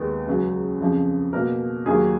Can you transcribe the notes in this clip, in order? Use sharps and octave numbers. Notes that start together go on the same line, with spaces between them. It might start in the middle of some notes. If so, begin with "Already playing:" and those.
Already playing: D#2 D#3 G#3 B3
C#2 C#3 F#3
F2 C#3 F3
B2 A#3 A#4
D#2 D#3 F#3 A#3 G#4